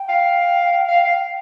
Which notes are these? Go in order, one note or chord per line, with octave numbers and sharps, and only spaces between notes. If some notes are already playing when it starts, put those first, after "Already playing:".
Already playing: G5
F5
F5
F5